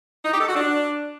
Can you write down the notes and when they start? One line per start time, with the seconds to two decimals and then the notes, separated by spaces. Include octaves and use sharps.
0.25 D#4
0.32 G4
0.40 A4
0.47 F#4
0.54 D4